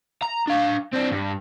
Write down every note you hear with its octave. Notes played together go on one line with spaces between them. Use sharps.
A#5
D4 F5
C4 D4
G2